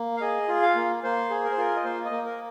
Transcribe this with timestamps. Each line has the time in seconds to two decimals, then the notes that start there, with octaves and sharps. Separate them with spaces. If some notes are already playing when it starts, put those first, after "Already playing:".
Already playing: A#3
0.17 F5
0.21 G#4 D#5
0.48 F4
0.62 F5
0.76 A#3
1.03 A#3 C5
1.30 G#4
1.44 A#4
1.52 C5
1.57 F4 A#4
1.76 D#5
1.84 A#3 C5
2.05 D#5
2.11 A#3
2.26 A#4